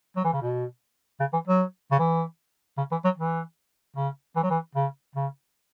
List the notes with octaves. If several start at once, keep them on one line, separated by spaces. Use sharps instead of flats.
F#3
E3
C#3
B2
C#3
E3
F#3
C#3
E3
C#3
E3
F#3
E3
C#3
E3
F#3
E3
C#3
C#3